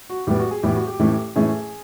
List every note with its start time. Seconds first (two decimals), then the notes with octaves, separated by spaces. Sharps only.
0.10 F#4
0.27 A2 E3 G3 B3 G4
0.39 F#4
0.51 G#4
0.63 A2 E3 G3 B3 G4
0.75 F#4
0.87 G4
0.99 A2 E3 A3 C#4
1.36 A2 E3 A3 C#4 G#4